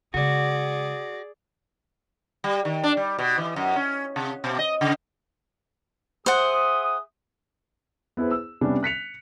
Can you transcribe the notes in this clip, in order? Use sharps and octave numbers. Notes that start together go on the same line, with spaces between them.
C#3 G#3 F#4 G#4 D5
G3
D#3
D4
G3
B2
E3
F#2
C#4
C3
B2
D#5
C#3
G#4 C5 E5 F#5 D#6
B3 E4 G#4 B4 C5
E6
C3 G3 B3 C#4 D4
F#6 B6 C#7 F7